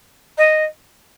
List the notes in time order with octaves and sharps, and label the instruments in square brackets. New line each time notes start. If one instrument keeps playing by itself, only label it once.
[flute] D#5